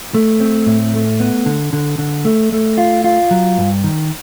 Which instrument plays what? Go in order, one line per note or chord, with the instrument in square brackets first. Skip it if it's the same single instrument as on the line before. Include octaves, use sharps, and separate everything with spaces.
[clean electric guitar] A3
C4
A2
A3
B3
D3
D3
D3
A3
A3
F4
F4
F#3
G2
D#3